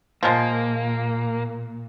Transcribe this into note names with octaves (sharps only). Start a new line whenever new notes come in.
A#2 F3 G#3 A#3